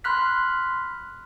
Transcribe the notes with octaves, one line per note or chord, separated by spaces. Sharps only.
B5 C6 F6 F#6 B6